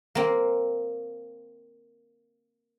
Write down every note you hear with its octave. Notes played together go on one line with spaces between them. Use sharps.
A#3 C4